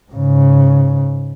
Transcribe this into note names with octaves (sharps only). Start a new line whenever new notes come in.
G#2 C#3